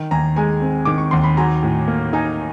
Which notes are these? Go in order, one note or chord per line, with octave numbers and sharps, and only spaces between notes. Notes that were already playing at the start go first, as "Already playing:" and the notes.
Already playing: D#3
D#2 G#5 A#5
G#3 G#5 A#5
C4
D#3 D6
C#6
D#2 C6
B5
F#3 G#5 A#5
A2
A#3
D#4 G#5 A#5